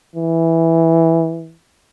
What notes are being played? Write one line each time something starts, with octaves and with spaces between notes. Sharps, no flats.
E3